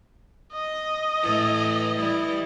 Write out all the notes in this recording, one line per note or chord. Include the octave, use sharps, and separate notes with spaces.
D#5
A2 E3 A4
E3 G3 E4